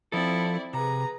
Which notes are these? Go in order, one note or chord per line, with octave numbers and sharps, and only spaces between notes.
F3 C4 E4 A4 D5
C3 G#4 B4 A#5